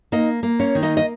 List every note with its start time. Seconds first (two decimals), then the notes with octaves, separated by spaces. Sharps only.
0.12 A#3 D#4 D#5
0.43 A#3
0.59 C#4 C#5
0.75 D#3
0.82 D#4 D#5
0.97 D#5